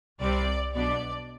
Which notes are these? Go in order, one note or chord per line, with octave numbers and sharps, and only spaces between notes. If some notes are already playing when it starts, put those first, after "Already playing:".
C2 C3 G3 C4 D5
B1 B2 B3 D4 D5